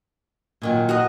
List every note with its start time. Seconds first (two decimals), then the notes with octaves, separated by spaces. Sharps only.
0.62 A#2 D#3 F#3
0.89 F#4 A#4 D#5